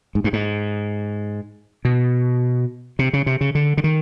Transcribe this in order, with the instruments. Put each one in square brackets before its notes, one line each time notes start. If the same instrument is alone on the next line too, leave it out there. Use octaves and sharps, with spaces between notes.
[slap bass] G#2
G2
G#2
B2
C3
C#3
C3
C#3
D3
D3
D#3